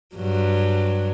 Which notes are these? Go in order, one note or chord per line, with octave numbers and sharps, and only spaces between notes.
G2 F#3